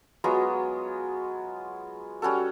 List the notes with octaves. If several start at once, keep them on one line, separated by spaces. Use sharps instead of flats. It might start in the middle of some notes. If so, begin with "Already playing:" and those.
F#3 G#3 B3 F4
G3 C#4 F#4 A4